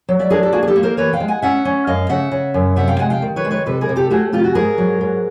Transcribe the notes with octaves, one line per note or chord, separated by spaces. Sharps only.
F#3
D5 E5
D4 G#4 A#4
G4 A4
A#3 F#4 G#4
G#4
G4 A4
A#3
A#4 C5
E3 B4 C#5
F5 G5
G#3
F#5 G#5
C#4 E5 F#5
C#4
F#2 D#5 F5
C#3 E5 F#5
C#3
F#2
C3 E5 F#5
F5 G5
G#3 F#5 G#5
F5 G5
D#3
B4 C#5
G#3
B4 C#5
C3 A4 B4
G#4 A#4
C3
G4 A4
A3 F#4 G#4
C3 F4 G4
F#4
G#2 G#4 A#4
F#3
G#2